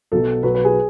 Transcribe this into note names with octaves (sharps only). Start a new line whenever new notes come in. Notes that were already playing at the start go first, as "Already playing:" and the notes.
B1 B2 F#3 A4
B1 B2 F#3 B4
B4
G#4